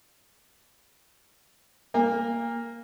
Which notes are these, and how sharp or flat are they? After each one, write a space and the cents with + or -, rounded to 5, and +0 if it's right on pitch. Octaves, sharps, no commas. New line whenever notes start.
A#3 +0 G#5 -40